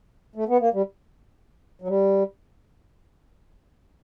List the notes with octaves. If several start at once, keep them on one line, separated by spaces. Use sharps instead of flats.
A3
B3
A#3
G3
F#3
G3